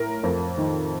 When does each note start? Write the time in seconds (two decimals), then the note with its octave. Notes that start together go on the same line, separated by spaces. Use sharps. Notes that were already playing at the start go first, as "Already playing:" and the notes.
Already playing: A2 A#4
0.23 F2
0.57 D#3